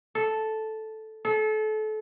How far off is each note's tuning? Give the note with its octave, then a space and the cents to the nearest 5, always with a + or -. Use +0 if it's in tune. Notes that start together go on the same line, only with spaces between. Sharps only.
A4 -5
A4 -30